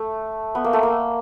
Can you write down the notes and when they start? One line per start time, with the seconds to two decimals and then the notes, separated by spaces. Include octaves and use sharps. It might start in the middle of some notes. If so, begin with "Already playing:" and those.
Already playing: A3
0.55 B3
0.64 A#3
0.73 A3
0.83 A#3